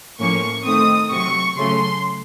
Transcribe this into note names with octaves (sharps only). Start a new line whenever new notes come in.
A2 F3 A#3 C#4 C#6
D#3 A3 C4 D#6
C3 F#3 C4 C#6
C#3 F#3 A3 C#4 C6